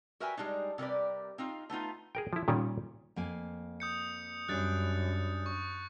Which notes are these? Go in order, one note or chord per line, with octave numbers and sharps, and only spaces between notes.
F#4 A#4 B4 E5 G5 G#5
G3 G#3 D4 D#4
C3 G3 A#4 B4 D5
C4 D#4 F4
A3 B3 D#4 F4
G#4 A#4 G5
F3 E4
A#2 D#3 G3 C#4
F2 A#3 G#5
D#6 G6 C#7
F#2 G3 D4 D5 F#6 A6
C#6